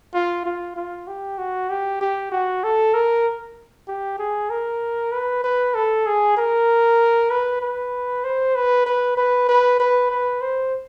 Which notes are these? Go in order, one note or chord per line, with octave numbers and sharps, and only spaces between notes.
F4
F4
F4
G4
F#4
G4
G4
F#4
A4
A#4
G4
G#4
A#4
B4
B4
A4
G#4
A#4
B4
B4
C5
B4
B4
B4
B4
B4
B4
C5